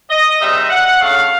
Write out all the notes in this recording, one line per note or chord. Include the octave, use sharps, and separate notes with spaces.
D#5
G#2 D#3 G3 C4 D#4 E5
F#5
C#3 F#3 A3 D4 F5